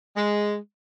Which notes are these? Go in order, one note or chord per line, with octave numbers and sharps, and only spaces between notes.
G#3